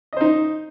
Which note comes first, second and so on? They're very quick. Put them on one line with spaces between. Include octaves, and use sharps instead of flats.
D#5 C5 D#4